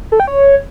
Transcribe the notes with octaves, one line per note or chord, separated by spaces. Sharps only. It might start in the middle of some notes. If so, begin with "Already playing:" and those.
A4
G5
C#5